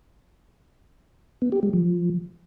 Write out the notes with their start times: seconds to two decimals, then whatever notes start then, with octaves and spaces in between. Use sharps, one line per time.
1.42 B3
1.52 G4
1.63 G#3
1.73 F3